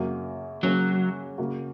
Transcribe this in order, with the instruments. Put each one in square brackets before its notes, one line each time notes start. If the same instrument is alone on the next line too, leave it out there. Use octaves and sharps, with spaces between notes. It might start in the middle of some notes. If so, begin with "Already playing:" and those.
Already playing: [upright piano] F#2 C#3 A#3 F#4
[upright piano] C#3 A#3 C#4 F#4 [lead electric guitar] F#3
[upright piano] C#3 A#3 F#4